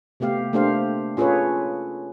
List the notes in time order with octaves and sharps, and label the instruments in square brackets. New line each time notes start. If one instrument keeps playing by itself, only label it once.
[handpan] C3 A3 B3 G4 F5
A3 A#3 D4 G4 C5 F5
C#4 F4 G#4 A4 B4 C#5